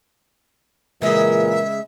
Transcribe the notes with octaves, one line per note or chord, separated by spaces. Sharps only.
A#2 C#3 E3 G#3 A#4 E5